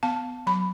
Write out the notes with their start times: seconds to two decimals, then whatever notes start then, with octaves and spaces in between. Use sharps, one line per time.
0.03 B3 A5
0.47 F#3 B5